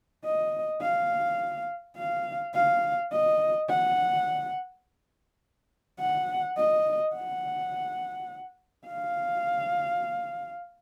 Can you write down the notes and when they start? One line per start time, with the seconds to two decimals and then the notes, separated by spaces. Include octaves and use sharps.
0.25 D#5
0.82 F5
1.97 F5
2.54 F5
3.12 D#5
3.69 F#5
6.00 F#5
6.57 D#5
7.14 F#5
8.87 F5